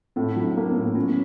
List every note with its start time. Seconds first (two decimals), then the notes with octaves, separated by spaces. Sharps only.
0.16 A2 C4 D4
0.36 F#3
0.43 C4 D4
0.57 A#3
0.69 B3 C#4
0.76 A2
0.95 F#3 B3 C#4